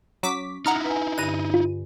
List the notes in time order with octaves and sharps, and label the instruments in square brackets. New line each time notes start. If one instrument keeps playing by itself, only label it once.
[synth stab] F#3 D6 B6 [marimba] C#4
[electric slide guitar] D#4 E4 [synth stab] F#5 A#5 F6
[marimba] B4 G#5
[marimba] G2 D3 [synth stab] D#7
[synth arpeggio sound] F4